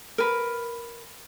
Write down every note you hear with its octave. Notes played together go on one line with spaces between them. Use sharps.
A#4 B4